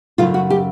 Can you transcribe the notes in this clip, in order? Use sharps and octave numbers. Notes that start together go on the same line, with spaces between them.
F#2 C#3 F#3 A3 F4
F#4
G4